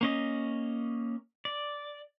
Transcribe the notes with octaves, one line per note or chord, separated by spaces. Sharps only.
A#3 C#4 D#5
D5